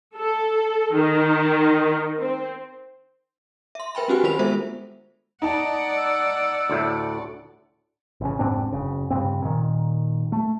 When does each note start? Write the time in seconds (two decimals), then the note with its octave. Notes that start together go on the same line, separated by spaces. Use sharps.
0.16 A4
0.94 D#3
2.20 C4
3.75 E5 C6
3.95 A#4 B4 G5 G#5 B5
4.08 C4 D4 F#4 G4 F#5 G#5
4.24 D#3 F4 A#4 C5 B5 F7
4.39 G#3 B3 A4 C5 E5
5.42 D#4 D5 F#5 A5
5.97 E6
6.70 D2 A2 A3
8.21 A1 C#3
8.39 F1 G#2 C4 D4
8.72 F#1 C#3
9.10 G2 C#3 C4
9.42 A#2 D#3
10.32 A3